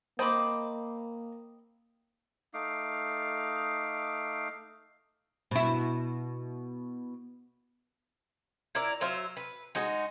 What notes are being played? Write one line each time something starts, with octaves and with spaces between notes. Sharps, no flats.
A#3 C4 D#4 C5 D#5 B5 D6
A3 D#4 F5 D6
B2 E4
E4 A#4 D5
F#3 C5 E5 F5
B4
G#3 D#4 F#4